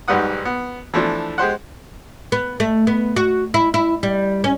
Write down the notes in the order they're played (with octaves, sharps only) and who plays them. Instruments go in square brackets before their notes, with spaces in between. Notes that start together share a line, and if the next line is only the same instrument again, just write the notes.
[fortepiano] B1 G#2 G3 B4 F#5 D#6
B3
E3 F3 A3 D4
G#3 G4 C5 F#5
[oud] B3
A3
B3
F#4
E4
E4
G3
C#4